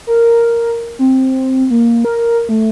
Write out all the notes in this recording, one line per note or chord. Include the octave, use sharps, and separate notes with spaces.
A#4
C4
A#3
A#4
A3